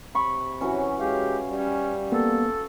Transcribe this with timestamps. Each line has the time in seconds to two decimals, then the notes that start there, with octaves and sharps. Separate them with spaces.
0.15 C3 B5 C#6
0.61 E3 F#3 C#4
0.99 G#3 G4 F5
1.50 G3 C#4
2.12 A#3 B3 A4